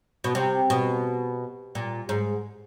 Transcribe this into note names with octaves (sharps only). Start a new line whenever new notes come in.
B2
C3
B2
A#2
G#2